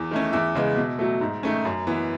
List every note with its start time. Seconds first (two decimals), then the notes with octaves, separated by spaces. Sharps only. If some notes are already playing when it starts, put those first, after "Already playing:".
Already playing: E2
0.11 D#3 A3 C#4
0.33 E2 E5
0.55 C#3 G#3 B3
0.77 B2
0.99 F#3 A3
1.21 G#2
1.43 D#3 A3 C#4
1.65 F#2
1.87 E3 B3